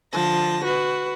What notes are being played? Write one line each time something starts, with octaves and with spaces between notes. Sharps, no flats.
D3 F3 A5 A#6
F#4 B4